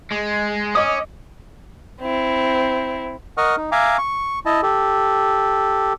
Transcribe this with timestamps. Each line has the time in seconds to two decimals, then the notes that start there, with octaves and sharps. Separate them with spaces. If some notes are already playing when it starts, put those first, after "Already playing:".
0.11 G#3
0.75 C#4 D#5 D6 D#6
2.00 C4 E4
3.37 A#4 D#5 F#5 C#6 D#6 F6
3.57 D#4
3.72 E5 F5 G#5 A#5 D6
3.98 C#6
4.46 E4 D#5 A5
4.63 G4 A4